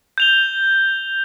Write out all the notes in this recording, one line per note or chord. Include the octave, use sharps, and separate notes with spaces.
G6 F7 G7